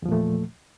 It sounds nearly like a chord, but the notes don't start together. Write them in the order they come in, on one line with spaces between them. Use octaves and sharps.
E2 F3 A#2 A3